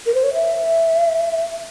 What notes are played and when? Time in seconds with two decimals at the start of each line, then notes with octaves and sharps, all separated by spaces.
0.06 A#4
0.15 C5
0.24 C#5
0.34 E5